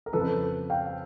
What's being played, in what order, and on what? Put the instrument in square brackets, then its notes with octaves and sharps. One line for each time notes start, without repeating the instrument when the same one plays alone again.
[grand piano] A#4
F2 C#3 F3 A4 B4
F5 G5